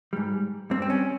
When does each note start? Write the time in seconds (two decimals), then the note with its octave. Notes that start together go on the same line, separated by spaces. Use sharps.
0.13 G#2 G3
0.70 G2 G3 C4
0.82 C4
0.90 C#4